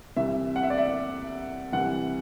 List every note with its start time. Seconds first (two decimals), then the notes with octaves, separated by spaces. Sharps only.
0.16 C2 C3 E3 E5
0.56 F#5
0.63 E5
0.70 D5
0.77 E5
1.72 C2 C3 E3 F#5